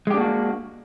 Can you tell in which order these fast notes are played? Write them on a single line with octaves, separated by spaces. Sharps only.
G#3 G4 D4 A#3 F#4